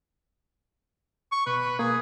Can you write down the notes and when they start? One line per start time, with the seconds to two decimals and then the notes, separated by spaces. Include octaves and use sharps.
1.32 C#6
1.47 B2 B4
1.79 A#3 G#4